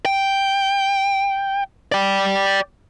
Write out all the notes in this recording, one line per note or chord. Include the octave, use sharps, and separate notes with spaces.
G5
D5 G5